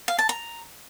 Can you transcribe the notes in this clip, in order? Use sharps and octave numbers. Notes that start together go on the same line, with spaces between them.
F5
A5
A#5